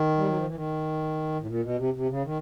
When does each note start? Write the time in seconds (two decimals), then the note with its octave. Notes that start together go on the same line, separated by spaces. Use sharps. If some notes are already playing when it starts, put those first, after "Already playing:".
Already playing: D#3
0.18 G3
0.27 F#3
0.36 F3
0.46 E3
0.55 D#3
1.41 A2
1.47 A#2
1.63 B2
1.78 C3
1.94 C3
2.09 C#3
2.24 D#3